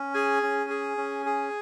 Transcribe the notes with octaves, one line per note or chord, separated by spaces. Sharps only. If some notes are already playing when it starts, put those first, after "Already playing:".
Already playing: C#4
G#4 G#5
C#4
G#4
C#4
G#4